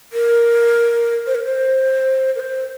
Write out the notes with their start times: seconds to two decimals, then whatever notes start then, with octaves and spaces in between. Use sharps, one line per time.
0.13 A#4
1.27 C5
1.35 A#4
1.44 C5
2.35 A#4
2.40 C5